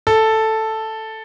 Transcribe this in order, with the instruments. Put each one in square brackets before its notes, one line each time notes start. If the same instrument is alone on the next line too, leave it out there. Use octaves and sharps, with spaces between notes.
[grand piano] A4